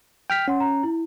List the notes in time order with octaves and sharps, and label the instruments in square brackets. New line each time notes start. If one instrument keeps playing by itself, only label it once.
[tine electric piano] G5 F6 B6
[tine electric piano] C#4 [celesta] F#5 C6
[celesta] A#5
E4